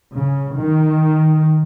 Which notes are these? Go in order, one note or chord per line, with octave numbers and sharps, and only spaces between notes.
C#3
D#3